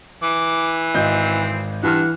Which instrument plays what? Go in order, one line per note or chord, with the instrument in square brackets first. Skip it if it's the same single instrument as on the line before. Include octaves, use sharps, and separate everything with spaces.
[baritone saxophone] E3 [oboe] D6
[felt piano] G#1 D#5 G6 [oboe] C4
[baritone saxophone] G2 [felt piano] E3 F6 [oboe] F#5